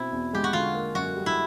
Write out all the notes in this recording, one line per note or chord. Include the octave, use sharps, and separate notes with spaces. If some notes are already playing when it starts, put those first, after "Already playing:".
Already playing: B2 C4 E4
E2
G#3 G4
F#4
D3 F4
A#3
F#2 F#4
G3
E4